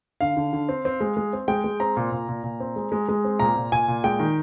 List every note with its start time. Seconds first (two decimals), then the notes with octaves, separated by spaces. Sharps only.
0.21 D3 F5
0.37 D3
0.53 D3
0.69 C4
0.85 C4
1.01 G#3
1.17 G#3
1.33 C4
1.48 G#3 G5
1.64 G#3
1.80 C4 A#5
1.97 A#2
2.12 A#2
2.29 A#2
2.44 A#2
2.60 C4
2.76 G#3
2.92 G#3
3.09 G#3
3.25 C4
3.40 A#2 A#5
3.56 A#2
3.72 A#2 G#5
3.88 A#2
4.04 G#3 G5
4.19 D#3